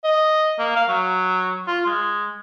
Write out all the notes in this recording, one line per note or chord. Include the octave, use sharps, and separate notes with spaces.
D#5
A#3
F5
F#3
F4
G#3